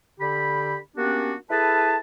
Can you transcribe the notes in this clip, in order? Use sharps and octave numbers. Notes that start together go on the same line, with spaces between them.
D3 G4 B5
A#3 B3 C#4 D4 F#4 G4
E4 G#4 A4 B4 A5